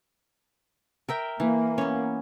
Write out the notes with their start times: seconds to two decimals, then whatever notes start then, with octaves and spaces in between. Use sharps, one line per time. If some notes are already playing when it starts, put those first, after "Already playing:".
1.09 A#4 E5 G5
1.40 E3 A#3
1.78 B3 C#4